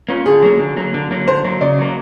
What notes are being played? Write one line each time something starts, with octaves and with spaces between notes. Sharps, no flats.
A#3 C#4 F4
D3 G#4
F#3 A#3
D3
F#3 A#3
D3
F#3 A#3
D3 C5
F#3 A#3
C#3 D5
F#3 A#3